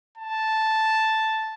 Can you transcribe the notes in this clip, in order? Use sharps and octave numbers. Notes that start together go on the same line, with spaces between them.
A5